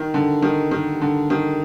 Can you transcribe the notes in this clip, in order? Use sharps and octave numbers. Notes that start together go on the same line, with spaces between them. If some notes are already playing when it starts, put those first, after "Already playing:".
Already playing: D#3
D3
D#3
D#3
D3
D#3